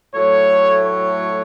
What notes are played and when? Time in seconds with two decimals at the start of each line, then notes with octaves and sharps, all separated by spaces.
0.15 A2 F#3 A3 C#5
0.85 C#5